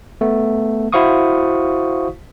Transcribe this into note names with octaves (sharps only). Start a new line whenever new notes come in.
A3 B3
E4 F#4 C5 F5 C#6 D#6